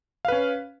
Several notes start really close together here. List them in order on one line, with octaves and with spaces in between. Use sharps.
F5 B4 C#4